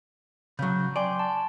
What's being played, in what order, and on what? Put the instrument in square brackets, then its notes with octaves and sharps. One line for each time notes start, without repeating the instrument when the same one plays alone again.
[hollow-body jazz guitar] C#3 F#3 [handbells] C#6 G6
[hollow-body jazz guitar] D5 [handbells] G5 G#5 C6
[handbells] A5